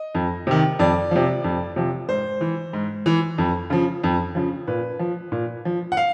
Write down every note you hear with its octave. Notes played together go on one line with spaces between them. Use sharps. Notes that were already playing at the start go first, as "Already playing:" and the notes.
Already playing: D#5
F2
C3 D#3
F2 D5
C3 F3
F2
C3 F3
G#2 C5
E3
G#2
E3
F2
C#3 F3
F2
C#3 F3
A#2 B4
F3
A#2
F3
F#5
F5